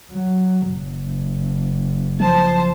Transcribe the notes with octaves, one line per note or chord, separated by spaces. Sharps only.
F#3
F#1
F3 C5 A5